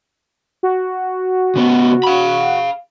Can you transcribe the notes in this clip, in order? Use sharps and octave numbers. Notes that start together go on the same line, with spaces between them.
F#4
C#3 B3
F5 B5